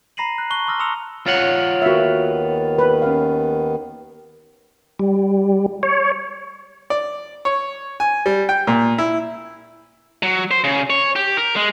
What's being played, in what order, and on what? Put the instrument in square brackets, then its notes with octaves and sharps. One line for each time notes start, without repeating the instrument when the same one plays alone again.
[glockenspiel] A#5 B5 A#6 C7 D#7 F#7
F#6
A5 C#6 F#6 G7
C6 D6 E6 F6 A#6
A#5 C6 D#6 E6 C#7 F7
[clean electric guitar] F4 C#5 F#5
[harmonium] D#2 D#3 B3 [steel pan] F#4 E5
[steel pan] B4
C#4 F5
[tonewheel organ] G3
C#5
[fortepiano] D5
C#5
G#5
G3
G5
A#2
E4
[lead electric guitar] F#3
C5
C#3
C#5
G4
A#4
G#3